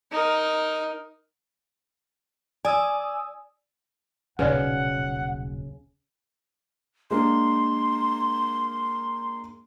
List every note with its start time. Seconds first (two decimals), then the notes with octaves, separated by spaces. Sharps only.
0.12 D#4 A#4
2.65 D5 G#5 D#6 E6
4.39 D#1 B1 C#3 B4 C#5 D5 F#5
7.11 G#3 A#3 D4 C6